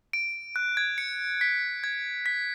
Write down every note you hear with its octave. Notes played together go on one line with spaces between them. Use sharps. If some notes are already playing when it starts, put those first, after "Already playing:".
D7
F#6
G#6
C#7
B6
G#6
B6